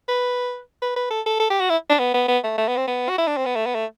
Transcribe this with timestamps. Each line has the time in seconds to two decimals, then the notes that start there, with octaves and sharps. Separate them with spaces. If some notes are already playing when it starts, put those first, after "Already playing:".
0.09 B4
0.82 B4
0.96 B4
1.11 A4
1.26 A4
1.40 A4
1.50 G4
1.61 F#4
1.70 E4
1.90 D4
1.99 B3
2.14 B3
2.28 B3
2.44 A3
2.58 A3
2.68 B3
2.77 C4
2.88 B3
3.09 F#4
3.18 E4
3.27 D4
3.37 C4
3.46 B3
3.56 A3
3.66 B3
3.75 A3